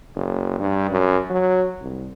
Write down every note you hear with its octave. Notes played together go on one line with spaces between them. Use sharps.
F#1
G2
F#2
F#3
C2